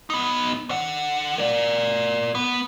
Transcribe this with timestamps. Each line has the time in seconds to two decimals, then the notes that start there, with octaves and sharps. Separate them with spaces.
0.10 B3 D#4
0.69 D3 F#5
1.38 A#4 D5
2.35 B3